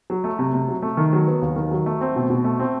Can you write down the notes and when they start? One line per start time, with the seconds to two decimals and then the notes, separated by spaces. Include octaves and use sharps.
0.10 F#3
0.24 A3
0.39 C3
0.54 C3
0.68 F#3
0.83 A3
0.97 D#3
1.13 F#3
1.28 B3
1.42 D#2
1.56 D#3
1.71 F#3
1.86 A3
2.01 C4
2.16 B2
2.30 B2
2.44 A3
2.59 C4